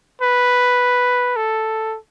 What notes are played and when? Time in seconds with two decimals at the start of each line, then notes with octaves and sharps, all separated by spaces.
0.21 B4
1.36 A4